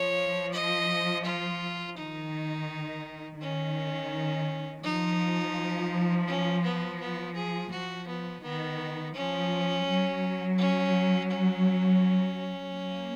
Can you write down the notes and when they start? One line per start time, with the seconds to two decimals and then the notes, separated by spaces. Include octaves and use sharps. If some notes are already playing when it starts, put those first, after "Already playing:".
Already playing: F3 C#5
0.53 D#5
1.25 F4
1.97 D#3 D#4
3.40 D#3 C#4
4.83 F3 D#4
6.28 C#4
6.63 B3
7.00 B3
7.35 G#4
7.71 F3 F#4
8.07 B3
8.43 D#3 B3
9.14 F3 C#4
9.87 F#3
10.58 C#4
11.30 C#4
12.73 A#3